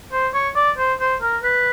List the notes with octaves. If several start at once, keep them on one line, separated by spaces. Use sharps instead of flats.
C5
C#5
D5
C5
C5
A#4
B4